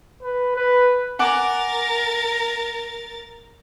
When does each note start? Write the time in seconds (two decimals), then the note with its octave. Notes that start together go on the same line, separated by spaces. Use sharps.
0.23 B4
0.56 B4
1.19 A#4 F#5 G#5 D6 A6